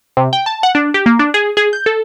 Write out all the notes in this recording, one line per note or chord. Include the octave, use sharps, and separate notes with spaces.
C3
G5
A5
F#5
D4
G4
A#3
D4
G#4
G#4
G6
A4